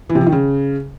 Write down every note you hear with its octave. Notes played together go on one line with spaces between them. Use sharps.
E3
C3
F3
D#3
C#3